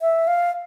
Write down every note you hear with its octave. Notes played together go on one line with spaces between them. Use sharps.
E5
F5